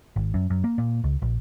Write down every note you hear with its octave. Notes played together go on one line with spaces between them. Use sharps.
G#1
F#2
F#2
A#3
A#2
C#2
A#1